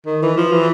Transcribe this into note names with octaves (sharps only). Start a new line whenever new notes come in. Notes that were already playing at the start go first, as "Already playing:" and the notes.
D#3
E3
F3
E3